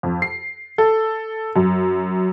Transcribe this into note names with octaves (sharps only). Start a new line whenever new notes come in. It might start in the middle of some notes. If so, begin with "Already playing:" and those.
F2
C7
A4
F#2